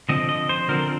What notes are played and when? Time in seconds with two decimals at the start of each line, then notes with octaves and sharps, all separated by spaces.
0.09 D3 F3 C4 D#5
0.29 D#5
0.49 C5
0.69 D3 F3 C4 A#4